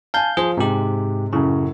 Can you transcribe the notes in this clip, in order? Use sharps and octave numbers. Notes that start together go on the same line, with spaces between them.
F5 G#5 A5 G6
F3 G#4 C5
G#2 C3 G#3 G4
F#2 A2 C#3